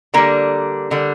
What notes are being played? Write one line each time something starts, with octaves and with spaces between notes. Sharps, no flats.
D3 G3 A#3
D3 G3